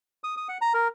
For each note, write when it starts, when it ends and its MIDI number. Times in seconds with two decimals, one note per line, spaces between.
0.24 0.35 87
0.37 0.48 87
0.49 0.58 78
0.61 0.73 82
0.74 0.88 70